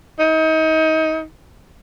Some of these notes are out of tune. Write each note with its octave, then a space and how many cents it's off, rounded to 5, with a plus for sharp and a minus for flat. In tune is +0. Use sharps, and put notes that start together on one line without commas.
D#4 +30